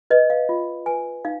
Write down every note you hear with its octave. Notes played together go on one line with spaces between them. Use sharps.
B4 D#5
F5
F4
B4 G#5
D#4 F5